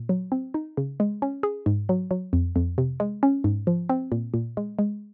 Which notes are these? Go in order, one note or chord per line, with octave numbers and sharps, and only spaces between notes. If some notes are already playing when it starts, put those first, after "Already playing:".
Already playing: A#2
F#3
C4
D#4
C#3
G#3
C#4
G#4
G#2
F#3
F#3
F2
F2
C3
G#3
C#4
G#2
F3
C4
A#2
A#2
G#3
G#3